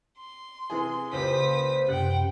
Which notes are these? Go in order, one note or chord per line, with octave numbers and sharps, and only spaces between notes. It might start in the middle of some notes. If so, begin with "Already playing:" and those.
C6
C3 E3 G#4
C#2 A#2 G4 B4 C5 D#6 B6
F#2 C3 F#5 G5 F#6